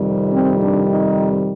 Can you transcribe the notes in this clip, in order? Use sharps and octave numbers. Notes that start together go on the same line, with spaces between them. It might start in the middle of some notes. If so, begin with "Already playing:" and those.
Already playing: F2 C3 D#3 G3
C4
D4
D#4